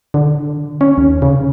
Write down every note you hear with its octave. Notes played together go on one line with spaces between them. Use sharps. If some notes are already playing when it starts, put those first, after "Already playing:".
D3
C#4
D#2
C#3